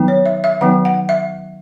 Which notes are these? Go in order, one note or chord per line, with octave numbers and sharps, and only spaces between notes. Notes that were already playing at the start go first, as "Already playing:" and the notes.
Already playing: D#3 F#3 B3 D#4
C#5
E5
E5
D#3 F#3 B3 D#4 F#5
F#5
E5